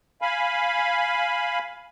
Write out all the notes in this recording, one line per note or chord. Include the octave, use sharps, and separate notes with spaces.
F5 G#5 B5